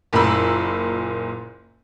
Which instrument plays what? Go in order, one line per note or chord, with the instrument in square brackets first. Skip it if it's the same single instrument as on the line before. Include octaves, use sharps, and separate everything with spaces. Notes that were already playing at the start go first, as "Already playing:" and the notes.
[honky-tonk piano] F#1 A#2 A#4 B5 E6